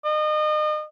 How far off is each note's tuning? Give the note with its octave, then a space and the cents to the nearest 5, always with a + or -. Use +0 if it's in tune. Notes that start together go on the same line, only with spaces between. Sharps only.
D#5 -35